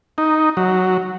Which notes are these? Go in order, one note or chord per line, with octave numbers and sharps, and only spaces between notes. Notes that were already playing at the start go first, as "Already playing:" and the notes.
D#4
F#3